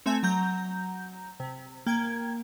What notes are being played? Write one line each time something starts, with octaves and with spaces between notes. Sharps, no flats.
A3 C4 E5 G#5
F#3 A#5 G6
C3
A#3 G5 G#6